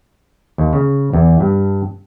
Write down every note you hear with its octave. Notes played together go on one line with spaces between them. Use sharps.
D#2
C#3
E2
G2